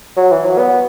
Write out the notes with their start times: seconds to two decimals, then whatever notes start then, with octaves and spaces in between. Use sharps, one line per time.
0.17 F#3
0.31 E3
0.44 F#3
0.58 B3